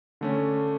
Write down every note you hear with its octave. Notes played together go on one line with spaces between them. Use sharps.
D3 A3 C#4